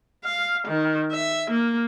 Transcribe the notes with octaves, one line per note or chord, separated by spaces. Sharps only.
F5
D#3
E5
A#3